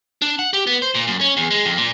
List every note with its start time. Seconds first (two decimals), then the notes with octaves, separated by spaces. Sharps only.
0.22 D4
0.39 F#5
0.53 G4
0.67 B3
0.82 C5
0.95 A#2
1.07 F#2
1.21 C#4
1.37 E2
1.51 G#3
1.65 F2
1.77 A#2